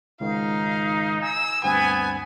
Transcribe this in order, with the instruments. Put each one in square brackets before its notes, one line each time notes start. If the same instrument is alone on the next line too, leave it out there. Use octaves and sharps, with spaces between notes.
[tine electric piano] C#2 G#2 D#3 [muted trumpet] D#4 [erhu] F5
[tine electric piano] G#5 [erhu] E6
[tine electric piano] D2 G2 C4 [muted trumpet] B3 [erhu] G#5